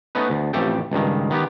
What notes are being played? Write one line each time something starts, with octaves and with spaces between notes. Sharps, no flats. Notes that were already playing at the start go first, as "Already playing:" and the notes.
A3 B3 C#4 D#4 B4
D2
A1 F2 A3 G4 A4 G5
C#2 G2 D#3
D#3 B3 G4